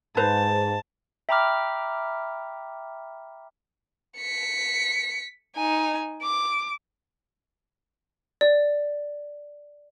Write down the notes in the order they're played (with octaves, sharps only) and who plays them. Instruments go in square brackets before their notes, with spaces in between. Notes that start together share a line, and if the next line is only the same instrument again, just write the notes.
[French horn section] G#2 [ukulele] B4 C5 A#5 [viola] A5
[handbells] E5 G5 A#5 B5 D6 F6
[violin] B6 C#7
D#4 G#5
D6
[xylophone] D5